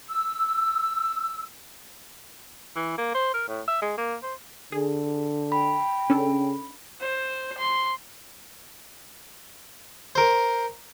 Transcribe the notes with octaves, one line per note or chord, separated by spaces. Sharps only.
E6
E3
A#3
C5
A#4
A2
E5
G#3
A#3
C5
D3 G#4
G5 B5
C#3 C#4 D4 A4
C5
C6
A#4 C5